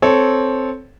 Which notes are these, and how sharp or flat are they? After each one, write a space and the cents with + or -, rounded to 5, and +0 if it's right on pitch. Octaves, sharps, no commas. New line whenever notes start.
C4 +0 A4 -10 C#5 +0